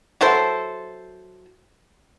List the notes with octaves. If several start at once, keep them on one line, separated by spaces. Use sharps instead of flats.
F#3 E4 A4 C5